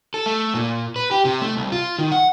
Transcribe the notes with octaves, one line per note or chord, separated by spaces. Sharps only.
A4
A3
A#2
B4
G4
C3
A3
C2
F4
D#3
F#5